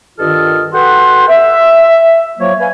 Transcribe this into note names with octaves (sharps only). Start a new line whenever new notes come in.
G2 D#3 F4 A4 D#5 F6
F#4 A4 B4 F#5 G5 C6
E5
F3 F#3 A#3 C#5
B4 C#5 F5 G#5